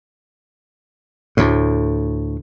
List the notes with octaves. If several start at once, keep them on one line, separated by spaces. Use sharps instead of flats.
D2 A2